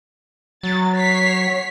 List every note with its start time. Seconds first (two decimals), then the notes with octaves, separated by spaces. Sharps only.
0.63 F#3 A6
0.95 C#5 B6 C7